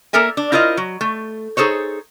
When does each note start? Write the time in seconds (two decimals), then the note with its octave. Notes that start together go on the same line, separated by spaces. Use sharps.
0.13 A#3 A4 A#4 E5 G#5
0.37 D4
0.52 E4 F4 A#4 C5 D#5
0.77 F#3
1.01 A3
1.57 D#4 G#4 A4 C5 C#5